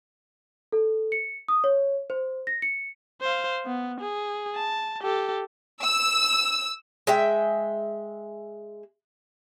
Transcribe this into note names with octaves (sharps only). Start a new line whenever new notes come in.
A4
C#7
D#6
C#5
C5
A#6
C#7
C5 F5
B3
G#4
A5
G4 A4
E6
G#3 E5 G5